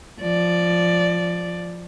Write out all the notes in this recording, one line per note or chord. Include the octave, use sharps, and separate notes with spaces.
F3 D5